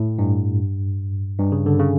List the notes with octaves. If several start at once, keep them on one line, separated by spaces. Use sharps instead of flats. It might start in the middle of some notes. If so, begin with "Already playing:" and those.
Already playing: A2
G2
G2
C#3
D3
C#3